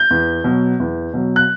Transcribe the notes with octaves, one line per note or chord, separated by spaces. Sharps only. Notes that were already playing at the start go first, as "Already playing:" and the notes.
Already playing: G6
E2
B2 F#3
E2
B2 F#3
F#6